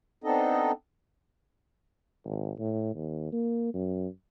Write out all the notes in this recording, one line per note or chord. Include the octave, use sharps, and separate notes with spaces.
B3 C4 D4 D#4 A4 D#5
G#1
A2
D#2
A#3
F#2